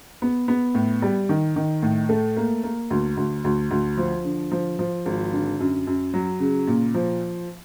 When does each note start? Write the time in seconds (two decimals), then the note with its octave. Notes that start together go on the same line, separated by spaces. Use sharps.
0.22 B3
0.48 B3
0.75 A2
1.02 G3
1.29 D#3
1.56 D#3
1.83 A2
2.09 A3
2.36 A#3
2.63 A#3
2.90 D2
3.17 D2
3.44 D2
3.71 D2
3.97 F3
4.24 D3
4.52 F3
4.79 F3
5.06 G#1
5.33 D3
5.60 F#2
5.87 F#2
6.14 F#3
6.40 C#3
6.67 A#2
6.94 F3